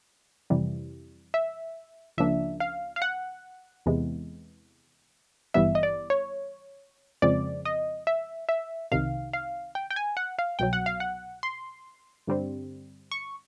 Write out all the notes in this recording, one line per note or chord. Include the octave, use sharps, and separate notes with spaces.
F2 C3 E3 G3
E5
C#2 C#3 F3 A#3 D4 E5
F5
F5
F#5
E2 C3 E3 G#3 B3
G#1 G2 E3 G3 B3 E5
D#5
D5
C#5
F2 C#3 F3 G#3 C4 D5
D#5
E5
E5
C2 C3 D#3 F5
F5
G5
G5
G#5
F#5
F5
C2 B2 F#3 G5
F#5
F5
F#5
C6
G2 D3 G3 C4
C#6